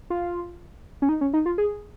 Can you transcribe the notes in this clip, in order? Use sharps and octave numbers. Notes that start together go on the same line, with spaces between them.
F4
C#4
D#4
C#4
D#4
F4
G#4